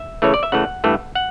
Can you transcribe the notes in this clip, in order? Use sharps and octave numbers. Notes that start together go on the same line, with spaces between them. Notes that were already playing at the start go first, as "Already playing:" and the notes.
Already playing: E5
C#3 E3 A3 C#5
D5
E5
C#3 E3 A3 F#5
G2 E3 A3
F#5